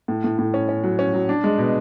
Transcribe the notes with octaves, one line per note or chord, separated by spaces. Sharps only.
A2
A2
A2
C#4
C#4
F#3
C#4
F#3
D4
G#3
B2